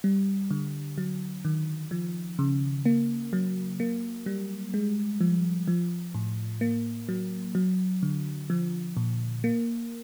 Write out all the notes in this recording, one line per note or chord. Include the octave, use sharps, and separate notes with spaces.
G3
D3
F#3
D#3
F3
C#3
A#3
F#3
A#3
G3
G#3
F3
F3
A2
A#3
F#3
F#3
D3
F3
A#2
A#3